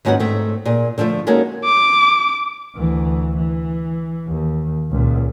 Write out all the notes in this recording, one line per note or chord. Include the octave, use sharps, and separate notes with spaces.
D#2 G#2 C#4 F#4 B4 F#5
G#2 A3 C4
A#2 G#4
D3 F3 F#3 A3
G#3 A#3 C#4 D#4 F#4 A4
D6
D2 E3
E3
D#2
C#2 A#2